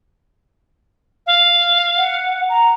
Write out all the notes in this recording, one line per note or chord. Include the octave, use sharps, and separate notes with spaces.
F5
F#5
A#5